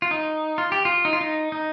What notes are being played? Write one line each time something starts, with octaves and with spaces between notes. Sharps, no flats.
F4
D#4
F4
G4
F4
D#4
F4
D#4
D#4